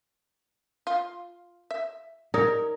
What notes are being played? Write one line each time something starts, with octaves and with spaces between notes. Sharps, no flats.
F4
E5
D#4 A#4 C#5 D5